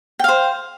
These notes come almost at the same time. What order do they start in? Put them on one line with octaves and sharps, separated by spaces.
G5 F5 C5